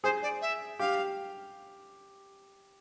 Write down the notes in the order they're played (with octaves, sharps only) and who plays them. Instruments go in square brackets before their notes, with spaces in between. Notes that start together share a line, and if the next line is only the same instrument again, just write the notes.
[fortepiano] G#4 [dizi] C5
[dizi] D5
E5
[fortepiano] G4 [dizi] F5